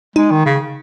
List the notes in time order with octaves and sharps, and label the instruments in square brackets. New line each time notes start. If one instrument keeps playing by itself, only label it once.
[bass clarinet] G#3 [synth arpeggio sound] D#4
[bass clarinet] D#3
C#3